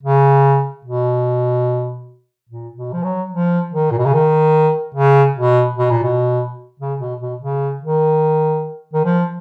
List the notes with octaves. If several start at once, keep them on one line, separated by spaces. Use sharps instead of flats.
C#3
B2
A#2
B2
F3
F#3
F3
D#3
A#2
B2
C#3
D#3
C#3
B2
B2
A#2
B2
C#3
B2
B2
C#3
D#3
D#3
F3